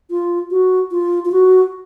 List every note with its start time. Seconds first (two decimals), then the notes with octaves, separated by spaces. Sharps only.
0.10 F4
0.51 F#4
0.91 F4
1.25 F4
1.32 F#4